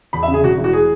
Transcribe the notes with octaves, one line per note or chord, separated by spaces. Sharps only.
E2 B5
E5
C#3
G#4
E1 F#4
E3
F#4
G#4